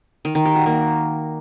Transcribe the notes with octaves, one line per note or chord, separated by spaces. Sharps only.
D#3
D#3
G4
F#4
A#3